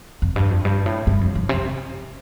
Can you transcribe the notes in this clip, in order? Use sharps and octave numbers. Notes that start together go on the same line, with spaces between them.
F2
G2
F2
G2
A2
G2
F2
G2
C3